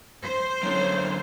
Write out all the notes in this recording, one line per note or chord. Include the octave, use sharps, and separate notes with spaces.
C5
F#2 D3 C#4 E4 C#5